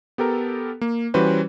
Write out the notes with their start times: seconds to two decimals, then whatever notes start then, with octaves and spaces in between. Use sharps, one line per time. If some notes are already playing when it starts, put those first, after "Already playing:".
0.18 B3 G4 A4 A#4
0.81 A#3
1.14 E3 G3 C#4 F#4 B4 C5